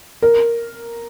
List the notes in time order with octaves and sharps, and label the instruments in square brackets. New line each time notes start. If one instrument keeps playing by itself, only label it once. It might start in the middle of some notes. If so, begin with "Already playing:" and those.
[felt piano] A#4